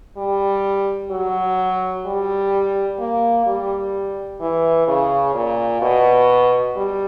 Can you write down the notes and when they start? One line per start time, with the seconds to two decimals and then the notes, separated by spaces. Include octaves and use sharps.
0.17 G3
1.11 F#3
2.05 G3
2.99 A#3
3.46 G3
4.40 E3
4.88 C#3
5.34 A#2
5.82 B2
6.76 G3